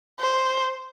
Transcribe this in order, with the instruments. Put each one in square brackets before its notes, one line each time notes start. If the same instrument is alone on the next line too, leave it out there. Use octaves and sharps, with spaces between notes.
[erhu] C5